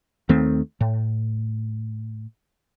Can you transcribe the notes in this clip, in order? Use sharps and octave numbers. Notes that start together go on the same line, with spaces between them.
D#2 D#3 A3 C4
A2